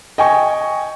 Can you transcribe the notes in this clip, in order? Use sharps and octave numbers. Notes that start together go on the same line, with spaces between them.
D#5 G5 G#5 C#6